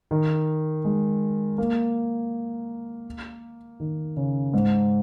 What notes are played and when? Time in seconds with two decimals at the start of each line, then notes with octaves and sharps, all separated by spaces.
0.11 D#3
0.85 G#3
1.58 A#3
3.80 D#3
4.17 C#3
4.53 G#2